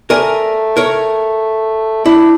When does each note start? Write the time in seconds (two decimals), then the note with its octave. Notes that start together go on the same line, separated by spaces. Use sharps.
0.10 A3 A#4 D5 G#5
0.77 A#4 C#5
2.06 D4 E4